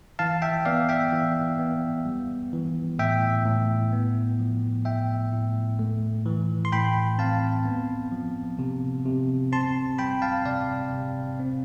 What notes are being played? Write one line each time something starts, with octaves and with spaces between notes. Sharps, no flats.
E3 F5 A5
E5 G5
B3 D5 F5
E5 G5
E3
B3
G3
E3
A2 E5 G5
A2
B3
F3
A2 E5 G5
A2
A3
E3
C6
A2 G5 B5
C4 F5 A5
B3
F3
C3
C3
C4 A5 C6
G3 G5 B5
F5 A5
C3 D5 F5
C3
C4